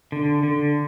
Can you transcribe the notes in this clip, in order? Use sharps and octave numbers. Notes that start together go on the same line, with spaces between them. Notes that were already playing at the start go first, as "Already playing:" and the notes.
D3
D3